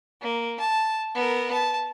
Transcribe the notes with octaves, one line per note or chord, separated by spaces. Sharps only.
A#3
A5
B3 A#4
A5